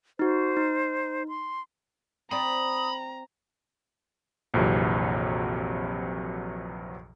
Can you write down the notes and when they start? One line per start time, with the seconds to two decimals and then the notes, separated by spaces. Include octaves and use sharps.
0.19 D#4 F#4 C5
0.57 D#4
1.28 C6
2.31 C4 D5 A#5 B5 D#6
4.54 A#1 F2 C3 E3 F#3